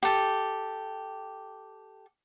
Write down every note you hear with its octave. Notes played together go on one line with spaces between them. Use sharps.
G4 A4